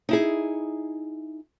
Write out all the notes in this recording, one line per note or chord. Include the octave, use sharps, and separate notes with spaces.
D#4 E4 G#4